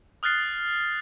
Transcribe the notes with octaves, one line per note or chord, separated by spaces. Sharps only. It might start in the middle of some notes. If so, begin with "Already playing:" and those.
D#6 F6 F#6 A6 C7